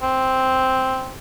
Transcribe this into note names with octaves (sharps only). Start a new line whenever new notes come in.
C4